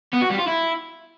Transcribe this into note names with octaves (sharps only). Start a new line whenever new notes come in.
B3
F#4
G3
F4
E4